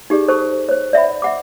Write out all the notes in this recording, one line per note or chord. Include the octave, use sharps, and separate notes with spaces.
D#4 G4 G#4 D5
A4 C5 A5 C#6
C5 C#5
D5 E5 F#5 B5
E5 F#5 D6